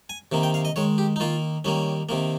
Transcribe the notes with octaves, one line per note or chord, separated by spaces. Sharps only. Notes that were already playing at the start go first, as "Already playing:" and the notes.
G#5
C3 D#3 A#3
G5
F5
D#5
D#3 G#3 C#5
G4
D#4
D#3 A#3 F4
D#3 G3 A#3 C#4
C3 D#3 A#3